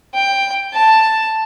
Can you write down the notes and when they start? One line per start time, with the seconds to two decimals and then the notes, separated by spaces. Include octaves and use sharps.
0.15 G5
0.74 A5